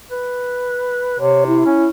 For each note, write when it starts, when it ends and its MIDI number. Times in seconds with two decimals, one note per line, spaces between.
0.11 1.19 71
1.19 1.64 48
1.19 1.45 73
1.47 1.89 64
1.65 1.87 61